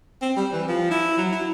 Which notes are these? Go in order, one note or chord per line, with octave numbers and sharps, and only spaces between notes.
C4
G3
E3
F3
E4
F#3
E4